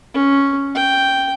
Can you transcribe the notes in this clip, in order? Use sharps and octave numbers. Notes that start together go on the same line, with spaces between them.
C#4
G5